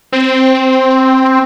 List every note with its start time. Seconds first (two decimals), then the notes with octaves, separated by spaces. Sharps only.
0.12 C4